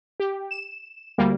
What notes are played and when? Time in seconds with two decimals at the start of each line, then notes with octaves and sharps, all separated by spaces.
0.20 G4
0.51 E7
1.18 D2 G3 A#3